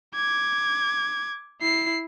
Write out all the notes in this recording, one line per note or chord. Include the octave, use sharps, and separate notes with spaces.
D6 G#6
E4 C7